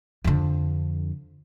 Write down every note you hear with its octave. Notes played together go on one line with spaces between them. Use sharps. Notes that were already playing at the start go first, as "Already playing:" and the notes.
F2 D3